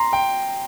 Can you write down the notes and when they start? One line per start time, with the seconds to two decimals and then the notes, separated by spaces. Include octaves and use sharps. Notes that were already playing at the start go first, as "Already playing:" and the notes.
Already playing: A#5 C6
0.13 G5